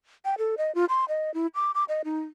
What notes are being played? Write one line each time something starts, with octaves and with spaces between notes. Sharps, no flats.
G5
A4
D#5
F4
C6
D#5
E4
D6
D6
D#5
D#4